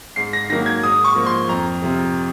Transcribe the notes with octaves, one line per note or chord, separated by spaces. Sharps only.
G#2 C7
A#6
D#3 F#3 A#3 A#6
G#6
G#2 D#6
C#6
F3 A#3
C6
F2 A#5
C3 F3